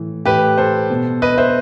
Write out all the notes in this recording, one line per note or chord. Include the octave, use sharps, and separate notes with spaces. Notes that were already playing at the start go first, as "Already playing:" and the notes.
Already playing: A2 E3
A2 E3 G4 B4
A4 C5
B2
B4 D#5
C5 E5